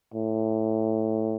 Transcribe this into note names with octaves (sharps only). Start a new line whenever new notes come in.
A2